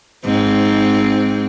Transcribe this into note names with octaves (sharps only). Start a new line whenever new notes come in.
G#2 C4